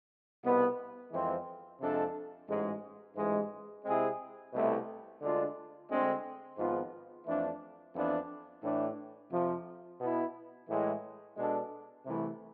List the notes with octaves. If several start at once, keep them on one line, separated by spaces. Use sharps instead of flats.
C2 B2 B3
F2 E3 G#3 C4
F2 C3 G#3 D4 A4
A1 G#2 G#3
A1 G#2 E3 G#3
C3 G#3 C4 E4 G#4
C2 B2 A3 C4 E4
D2 D3 G#3 D4 F4
D2 D3 G#3 C4
G#1 G#2 F3 B3 F4
F2 E3 A3 D4
F2 E3 B3 D4
A2 E3 A3 D4
F2 C3 F3
B2 B3 E4
A2 E3 G#3
B2 G#3 D4 A4
C2 C3 E3 A3